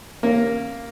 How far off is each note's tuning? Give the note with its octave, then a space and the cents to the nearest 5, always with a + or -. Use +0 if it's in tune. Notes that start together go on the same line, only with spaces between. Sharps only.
A#3 +0 C#4 -25